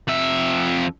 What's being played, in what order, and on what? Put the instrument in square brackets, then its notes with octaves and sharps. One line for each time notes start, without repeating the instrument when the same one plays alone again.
[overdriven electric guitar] F2 E5